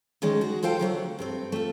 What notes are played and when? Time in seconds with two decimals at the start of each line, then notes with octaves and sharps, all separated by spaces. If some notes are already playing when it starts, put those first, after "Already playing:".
0.22 D2 D#3 G#3 C#4 D4
0.41 F#4 G#4
0.63 F4 A4 C5 F5 G5
0.79 D3 F#3 A3 D4
1.19 G2 A3 C4
1.52 A3 F4